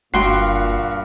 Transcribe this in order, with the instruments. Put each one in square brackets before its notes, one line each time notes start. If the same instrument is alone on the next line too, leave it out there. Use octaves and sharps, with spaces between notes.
[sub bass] F#1 [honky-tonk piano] G2 F#4 [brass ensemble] A#2 F5 [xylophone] G5 C6 C7